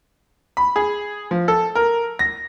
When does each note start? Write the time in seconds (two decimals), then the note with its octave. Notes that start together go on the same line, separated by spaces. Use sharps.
0.57 B5
0.76 G#4
1.31 F3
1.48 A4
1.75 A#4
2.19 A#6